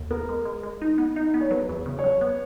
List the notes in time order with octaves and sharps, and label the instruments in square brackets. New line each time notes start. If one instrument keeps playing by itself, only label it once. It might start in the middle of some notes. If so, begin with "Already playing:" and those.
Already playing: [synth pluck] D#2
[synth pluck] B3 [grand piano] A#4
[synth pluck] G#3
G#3
G#3
D#4
B3
D#4
B3
[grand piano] C#5
[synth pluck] F#3 [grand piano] B4
[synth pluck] E2
C#3
[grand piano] C#5
[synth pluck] F#3
B3